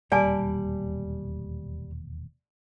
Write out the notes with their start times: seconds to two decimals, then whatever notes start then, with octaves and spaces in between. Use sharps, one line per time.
0.12 E1 D#2 A#2 G3 D5 G#5 A5